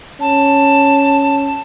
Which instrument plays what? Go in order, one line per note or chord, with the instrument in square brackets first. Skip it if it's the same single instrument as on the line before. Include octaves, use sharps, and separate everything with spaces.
[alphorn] C#4 [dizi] A5